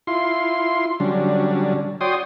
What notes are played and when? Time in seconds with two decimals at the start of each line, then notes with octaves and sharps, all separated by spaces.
0.07 E4 F4 C6
1.00 D3 F#3 G3 C#4 D4
2.01 F#4 C#5 D5 G5 C6 D#6